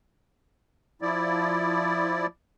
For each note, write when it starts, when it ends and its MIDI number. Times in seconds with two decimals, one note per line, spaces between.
1.02 2.27 53
1.02 2.27 64
1.02 2.27 74